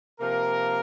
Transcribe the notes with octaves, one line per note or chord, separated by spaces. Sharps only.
C3 F3 A#3 A#4